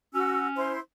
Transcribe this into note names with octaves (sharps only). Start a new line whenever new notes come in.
C#4 F#4 E6
E4 C5 C6